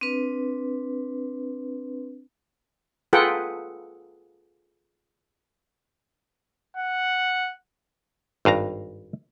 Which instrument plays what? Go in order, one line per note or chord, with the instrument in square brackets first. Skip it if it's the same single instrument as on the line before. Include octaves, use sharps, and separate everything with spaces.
[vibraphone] C4 D4 B4
[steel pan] F4 G#4 A4 B4 F#5 G5
[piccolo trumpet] F#5
[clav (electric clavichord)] G#1 G2 F5 A#5